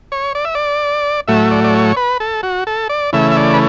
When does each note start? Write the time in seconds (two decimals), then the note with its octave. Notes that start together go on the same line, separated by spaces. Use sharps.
0.12 C#5
0.35 D5
0.45 E5
0.55 D5
1.28 A2 F#3 A3 E5
1.51 D5
1.64 D5
1.74 C#5
1.97 B4
2.20 A4
2.43 F#4
2.67 A4
2.89 D5
3.13 C#3 E3 A3 E5
3.31 E5
3.37 D5
3.54 B4